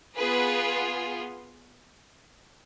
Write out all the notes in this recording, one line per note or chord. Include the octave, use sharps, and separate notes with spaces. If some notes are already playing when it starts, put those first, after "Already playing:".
B3 F4 G#4 B4